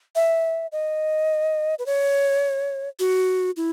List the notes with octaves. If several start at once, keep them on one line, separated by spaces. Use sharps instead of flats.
E5
D#5
B4
C#5
F#4
E4